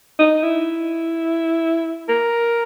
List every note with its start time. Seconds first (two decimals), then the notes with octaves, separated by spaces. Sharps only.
0.19 D#4
0.43 E4
2.09 A#4